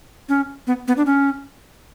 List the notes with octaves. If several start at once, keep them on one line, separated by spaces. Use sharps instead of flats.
C#4
B3
B3
D4
C#4